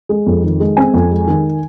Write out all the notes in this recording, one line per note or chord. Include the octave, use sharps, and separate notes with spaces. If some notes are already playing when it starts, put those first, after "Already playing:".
G#3
F2
D#3
G#3
C4 G#5
F2
G#3
D#3